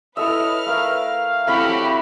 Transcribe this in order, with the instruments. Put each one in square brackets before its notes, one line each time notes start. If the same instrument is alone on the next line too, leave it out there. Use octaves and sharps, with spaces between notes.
[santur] E4 A4 E5 [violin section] B4 F6 [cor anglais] D#5
[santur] A3 A#4 [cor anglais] F5
[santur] A3 E4 [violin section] C4 F#4 G4 [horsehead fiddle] B5